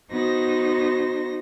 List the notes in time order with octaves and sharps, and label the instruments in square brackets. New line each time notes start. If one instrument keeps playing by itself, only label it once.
[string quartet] B3 D#4 F#4 C5 A#6